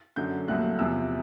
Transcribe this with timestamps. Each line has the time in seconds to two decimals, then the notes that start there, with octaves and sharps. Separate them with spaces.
0.16 F#2 D3 F#3 G6
0.48 C2 A#2 F#3 A3 F#6
0.79 E2 C3 F3 E6